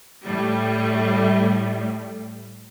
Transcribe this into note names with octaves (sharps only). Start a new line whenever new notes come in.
A2 G3